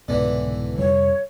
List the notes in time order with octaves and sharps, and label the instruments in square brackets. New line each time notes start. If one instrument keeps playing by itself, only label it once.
[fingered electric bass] C2 G#2 B2 [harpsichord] D3 E3
[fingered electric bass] F2 C3 G3 [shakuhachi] C#5